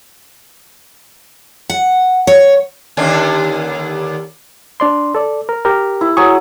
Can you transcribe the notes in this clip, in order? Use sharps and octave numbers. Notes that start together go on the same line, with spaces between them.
F#5
C#5
D#2 D3 C#4
D4 D5 C6
A4 D5
A#4
G4 A#4
E4
F#3 G#4 C#6